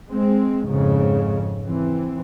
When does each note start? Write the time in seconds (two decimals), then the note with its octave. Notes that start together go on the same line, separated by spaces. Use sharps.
0.10 G#3 C4
0.66 F2 G#2 C#3
1.64 E3 C4